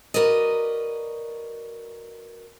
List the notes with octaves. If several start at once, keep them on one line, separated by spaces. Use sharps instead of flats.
F#4 A#4 B4 D5 D#5